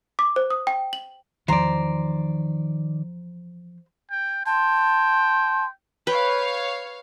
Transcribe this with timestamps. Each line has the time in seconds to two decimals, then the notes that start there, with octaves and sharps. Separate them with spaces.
0.19 D6
0.36 C5
0.50 D#6
0.67 G5
0.93 F#7
1.48 E2 D#3 F3 C5 D5 A#5
4.11 G5
4.46 G5 A5 C6
6.07 B4 C#5 F5 G5